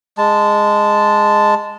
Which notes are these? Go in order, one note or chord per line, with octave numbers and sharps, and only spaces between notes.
G#3 A5